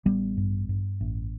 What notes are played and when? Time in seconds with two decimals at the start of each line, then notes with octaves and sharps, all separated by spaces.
0.05 A1 G3 B3
0.37 G2
0.69 G2
1.01 A1